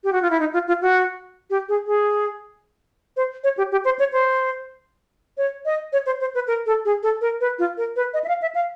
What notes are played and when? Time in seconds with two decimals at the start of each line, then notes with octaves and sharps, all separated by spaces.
0.04 G4
0.12 F#4
0.22 F4
0.31 E4
0.40 D#4
0.53 F4
0.68 F4
0.82 F#4
1.50 G4
1.69 G#4
1.87 G#4
3.17 C5
3.44 C#5
3.58 G4
3.72 G4
3.85 C5
3.99 C#5
4.13 C5
5.37 C#5
5.65 D#5
5.93 C#5
6.06 C5
6.21 C5
6.35 B4
6.47 A#4
6.66 A4
6.85 G#4
7.03 A4
7.21 A#4
7.41 B4
7.59 F4
7.77 A#4
7.96 B4
8.14 D#5
8.24 E5
8.28 F5
8.42 E5
8.55 F5